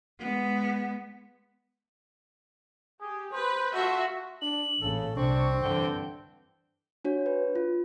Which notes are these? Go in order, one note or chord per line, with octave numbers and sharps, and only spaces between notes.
G#3 B3
G4 G#4
B4 C5
A3 F4 F#4 E5
D4 F#7
A1 A#2 C#3 A4
C2 C3 C4 D4 C#6
G2 D3 E3 G5
D4 F#4 C#5
B4
F4